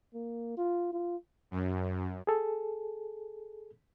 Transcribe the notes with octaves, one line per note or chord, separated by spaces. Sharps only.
A#3
F4
F4
F#2
G#4 A4